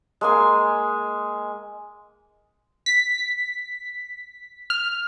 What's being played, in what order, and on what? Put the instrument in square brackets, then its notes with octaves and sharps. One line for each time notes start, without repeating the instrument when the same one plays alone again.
[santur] G#3 A#3 G#5
[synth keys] B6
F6